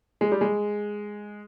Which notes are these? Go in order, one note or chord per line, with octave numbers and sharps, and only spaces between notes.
G#3
G3
G#3